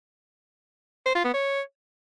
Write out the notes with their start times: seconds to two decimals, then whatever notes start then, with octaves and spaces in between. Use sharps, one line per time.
1.06 C5
1.15 F4
1.24 B3
1.34 C#5